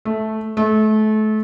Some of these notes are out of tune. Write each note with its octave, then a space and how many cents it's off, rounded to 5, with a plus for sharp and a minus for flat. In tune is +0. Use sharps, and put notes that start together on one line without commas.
A3 -10
A3 -30